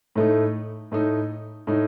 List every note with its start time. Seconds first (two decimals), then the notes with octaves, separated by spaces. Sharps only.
0.16 A2 A3 D#4
0.92 A2 A3 D#4
1.67 A2 A3 D#4